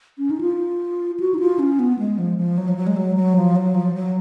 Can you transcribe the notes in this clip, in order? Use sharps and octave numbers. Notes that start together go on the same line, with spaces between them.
C#4
D#4
F4
F#4
D#4
F4
C#4
B3
G#3
F3
F3
F#3
F3
F#3
G#3
F#3
F#3
F3
F#3
F3
F#3